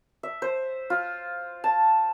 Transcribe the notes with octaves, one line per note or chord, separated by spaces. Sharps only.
E5
C5
F4
A5